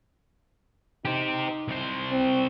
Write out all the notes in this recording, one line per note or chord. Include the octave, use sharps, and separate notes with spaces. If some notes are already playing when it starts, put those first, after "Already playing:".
D#4 G4 C5
C2 C5
C4